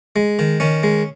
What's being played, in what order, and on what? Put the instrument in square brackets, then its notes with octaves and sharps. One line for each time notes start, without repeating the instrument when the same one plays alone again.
[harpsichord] G#3
D#3
D#3 C#4
G#3